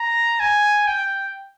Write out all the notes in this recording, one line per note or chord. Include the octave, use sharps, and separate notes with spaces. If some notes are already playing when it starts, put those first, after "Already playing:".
Already playing: A#5
G#5
G5